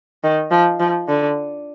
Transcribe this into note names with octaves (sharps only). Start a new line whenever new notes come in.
D#3
F3
F3
D3